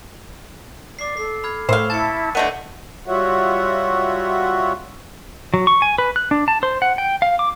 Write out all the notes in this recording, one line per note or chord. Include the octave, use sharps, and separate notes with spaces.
D5 D6 C7
A4 C7
B5 F6 G#6
A2 C5 F5 C#6 E6 E7
E4 A5 A6 C#7
D3 A3 B3 D#5 G6 C#7 D#7
G3 F4 F#4 C#5 E5 F#5
F#3
C#6
G#5
B4
F#6
D4
A5
C5
F#5
G5
F5
D6